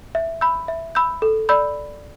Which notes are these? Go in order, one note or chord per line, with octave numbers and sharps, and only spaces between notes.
E5
B5 E6 G6
E5
B5 E6 G6
A4
D5 B5 E6 G6